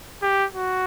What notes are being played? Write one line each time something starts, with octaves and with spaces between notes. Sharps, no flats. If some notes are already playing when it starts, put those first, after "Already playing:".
G4
F#4